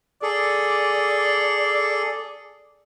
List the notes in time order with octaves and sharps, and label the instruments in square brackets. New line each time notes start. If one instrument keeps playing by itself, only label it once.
[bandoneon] G#4 A4 [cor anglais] D5